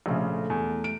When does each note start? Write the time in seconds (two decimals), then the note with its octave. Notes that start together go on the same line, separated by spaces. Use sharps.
0.06 A#1 C#3 A3
0.50 E2
0.84 D7